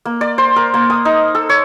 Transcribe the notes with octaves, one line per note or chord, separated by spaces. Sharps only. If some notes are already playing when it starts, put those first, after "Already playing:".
A#3
D5
C5
A#4
A#3
D#6
D#4
A4
C#5